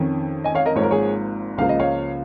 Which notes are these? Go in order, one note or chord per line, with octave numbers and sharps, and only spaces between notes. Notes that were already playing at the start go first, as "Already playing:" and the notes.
Already playing: F2 D#3 C#4
D#5 G#5
C#5 F5
A#4 D#5
G#1 G#2 F3 A#3 C#5
A#4
G#4 C#5
C#2 C#3 F3 A#3 F5
D#5
C#5 F5